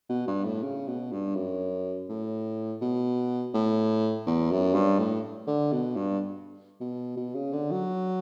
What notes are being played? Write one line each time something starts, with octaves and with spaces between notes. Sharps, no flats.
B2
G2
A2
C#3
B2
G2
F#2
A2
B2
A2
E2
F#2
G2
A2
D3
B2
G2
B2
B2
C#3
D3
F#3